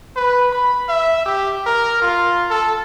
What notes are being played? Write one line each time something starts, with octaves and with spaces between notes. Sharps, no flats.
B4
B5
E5
G4
A#4
F4
A4